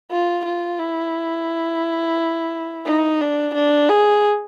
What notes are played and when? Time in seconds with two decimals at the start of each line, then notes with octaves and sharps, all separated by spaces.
0.11 F4
0.45 F4
0.80 E4
2.86 D#4
3.20 D4
3.55 D4
3.89 G#4